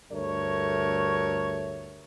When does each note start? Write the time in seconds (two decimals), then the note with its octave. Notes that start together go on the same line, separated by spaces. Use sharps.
0.11 D2 G2 A3 A#4 C#5